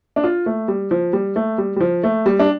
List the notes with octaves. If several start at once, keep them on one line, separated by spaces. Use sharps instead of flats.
D4
F4
A3
G3
F3
G3
A3
G3
G3
F3
A3
G3
D4